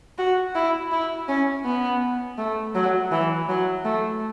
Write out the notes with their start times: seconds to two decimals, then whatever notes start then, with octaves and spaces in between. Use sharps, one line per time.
0.18 F#4
0.55 E4
0.92 E4
1.28 C#4
1.65 B3
2.38 A3
2.75 F#3
3.12 E3
3.49 F#3
3.84 A3